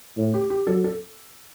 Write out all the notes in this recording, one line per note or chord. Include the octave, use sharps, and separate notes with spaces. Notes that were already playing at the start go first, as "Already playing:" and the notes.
A2
G4
G4
F#3 A4
A4